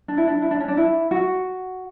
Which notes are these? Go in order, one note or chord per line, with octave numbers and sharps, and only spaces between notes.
D4
E4
D4
E4
D4
C#4
D4
E4
F#4